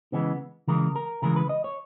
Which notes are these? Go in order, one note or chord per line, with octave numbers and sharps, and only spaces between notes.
C#3 E3 G#3 B3
C#3 E3 G#3 A#4
A#4
C#3 E3 G#3 A#4
B4
D#5
C#5